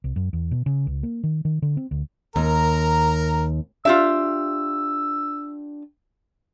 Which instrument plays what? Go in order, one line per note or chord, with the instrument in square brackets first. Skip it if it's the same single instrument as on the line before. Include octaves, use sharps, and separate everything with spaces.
[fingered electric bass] C2
F#2
E2
B2
C#3
C#2
A#3
D#3
D#3
D3
C4
D2
[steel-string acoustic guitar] D#2 [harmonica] A#4 A#5
[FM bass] D4 [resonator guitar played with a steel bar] F4 G4 E5 [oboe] E6